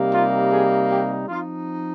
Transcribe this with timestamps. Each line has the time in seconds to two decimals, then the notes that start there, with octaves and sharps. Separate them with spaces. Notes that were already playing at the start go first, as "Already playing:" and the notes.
Already playing: C3 G3 A#3 D#4
0.12 F4
0.51 G#4
0.89 G4
1.27 F3 C4 D#4 F4